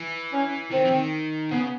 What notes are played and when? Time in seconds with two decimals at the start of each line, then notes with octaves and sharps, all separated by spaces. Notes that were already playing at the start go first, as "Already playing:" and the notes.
Already playing: E3
0.32 C#4
0.71 D#3 C4
0.86 E3
0.91 D#3
1.51 C#3 B3